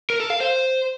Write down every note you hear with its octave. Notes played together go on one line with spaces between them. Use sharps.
A#4
A4
F5
C5